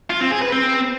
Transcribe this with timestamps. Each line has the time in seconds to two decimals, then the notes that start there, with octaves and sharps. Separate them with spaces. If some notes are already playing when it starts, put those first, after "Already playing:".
0.10 F4
0.21 C4
0.31 G#4
0.42 B4
0.52 C4